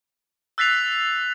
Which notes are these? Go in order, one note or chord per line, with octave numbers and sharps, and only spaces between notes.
E6 F#6 A6 B6 C7 F7